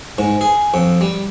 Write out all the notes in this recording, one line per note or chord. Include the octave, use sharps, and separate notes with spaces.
G#2
G#4
F2
G3